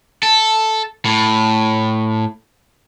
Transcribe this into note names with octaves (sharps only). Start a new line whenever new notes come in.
A4
A2